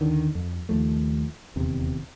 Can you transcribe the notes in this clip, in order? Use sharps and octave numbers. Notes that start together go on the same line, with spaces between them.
D#2 D3 D#3
F2
D#2 F3 A3
D#1 E2 C3